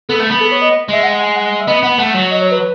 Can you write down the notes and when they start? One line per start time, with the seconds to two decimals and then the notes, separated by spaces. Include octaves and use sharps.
0.09 B3 A4
0.20 A3
0.30 B3
0.40 A4
0.52 C#5
0.62 D#5
0.89 G#3 E5
1.03 F#5
1.20 G#5
1.36 F#5
1.60 E5
1.68 B3 D#5
1.83 B3 F#5
1.98 A3 F#5
2.15 F#3
2.31 D#5
2.41 C#5
2.51 B4